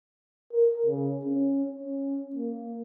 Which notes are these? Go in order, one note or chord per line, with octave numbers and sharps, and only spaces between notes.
A#4
C#3
C#4
C#4
A#3